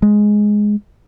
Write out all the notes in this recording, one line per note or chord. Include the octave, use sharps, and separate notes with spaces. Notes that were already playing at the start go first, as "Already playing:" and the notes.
G#3